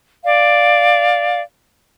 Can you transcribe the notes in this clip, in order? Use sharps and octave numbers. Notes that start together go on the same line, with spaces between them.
D5 F5